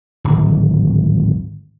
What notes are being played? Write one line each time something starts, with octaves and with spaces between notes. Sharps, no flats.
D1 G#1